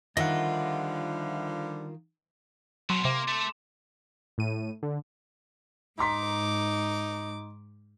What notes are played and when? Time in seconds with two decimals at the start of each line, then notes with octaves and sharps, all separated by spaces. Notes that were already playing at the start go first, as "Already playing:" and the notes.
0.17 D3 D#3 F3 G3 F4 D#5 E5 F#5
2.90 B2 F#3 C#4 C6
3.05 C3 A#3 D6
3.28 A3 A4 C6
4.38 A2 D#7
4.83 D3
5.99 G#2 D#4 A#5 C6 D6 B6